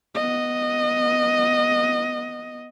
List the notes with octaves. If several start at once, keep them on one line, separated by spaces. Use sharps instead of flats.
B3 D#5